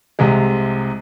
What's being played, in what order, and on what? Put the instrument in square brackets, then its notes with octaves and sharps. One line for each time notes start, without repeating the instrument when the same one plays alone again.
[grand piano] C2 C3 G#3